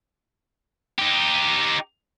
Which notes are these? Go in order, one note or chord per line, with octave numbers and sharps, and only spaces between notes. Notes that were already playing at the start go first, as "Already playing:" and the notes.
D#4 G4